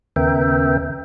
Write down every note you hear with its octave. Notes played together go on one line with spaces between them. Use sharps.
D#2 C#3 B3 A#4 E5 G5